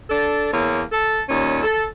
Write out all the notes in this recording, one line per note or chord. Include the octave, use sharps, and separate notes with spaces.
D4 A4
E2 A#3 C#5
A4
D#2 A#2 C#4
A4